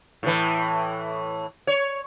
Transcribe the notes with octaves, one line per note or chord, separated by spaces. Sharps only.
A2 E3
C#5